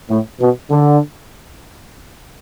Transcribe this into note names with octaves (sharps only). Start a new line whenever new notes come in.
A2
B2
D3